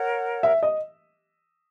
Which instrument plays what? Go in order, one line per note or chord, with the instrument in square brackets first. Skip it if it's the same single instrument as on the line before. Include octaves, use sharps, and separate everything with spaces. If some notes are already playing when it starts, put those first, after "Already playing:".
Already playing: [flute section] A#4 C#5 F#5
[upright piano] E5
D#5